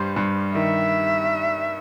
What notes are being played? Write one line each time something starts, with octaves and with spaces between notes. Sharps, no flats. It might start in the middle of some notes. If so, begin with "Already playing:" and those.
Already playing: G2 G3 C5
G2
D#3 E5